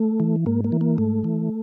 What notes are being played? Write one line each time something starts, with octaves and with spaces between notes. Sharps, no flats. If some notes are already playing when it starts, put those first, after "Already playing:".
Already playing: A3
E3
G#2 A#3
A#3
E3
A#3
G#2 A3
E3